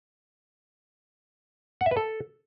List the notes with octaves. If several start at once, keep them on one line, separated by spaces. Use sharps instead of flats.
F#5
E5
B4
A4